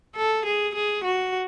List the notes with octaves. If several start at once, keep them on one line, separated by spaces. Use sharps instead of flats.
A4
G#4
G#4
F#4